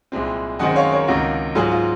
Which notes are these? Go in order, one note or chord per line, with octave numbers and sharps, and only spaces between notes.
C2 A#2 G#3 C4
F#2 D#3 G#3 C4 D#5 F#5
C#5 F5
A#4 C#5
C#2 C3 D#3 A#3 F#4 A#4
G#2 F#3 A#3 F4 G#4
F4